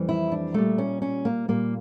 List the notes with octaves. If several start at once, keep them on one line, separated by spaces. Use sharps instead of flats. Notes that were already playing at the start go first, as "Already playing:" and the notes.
Already playing: F2 E3 G3
E4
D4
A#2 G3 A3
C#4
C#4
A#3
A#2 G3 A#3